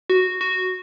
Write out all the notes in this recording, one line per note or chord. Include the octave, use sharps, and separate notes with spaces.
F#4
F#4